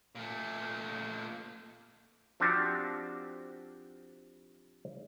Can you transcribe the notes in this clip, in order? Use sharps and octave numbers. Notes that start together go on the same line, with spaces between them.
A#2 A3
F3 C4 D4 F#4 G4